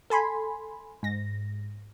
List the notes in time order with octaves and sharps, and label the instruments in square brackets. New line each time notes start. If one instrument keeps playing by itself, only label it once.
[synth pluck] A4 G#5 B5 C6
G#2 A#6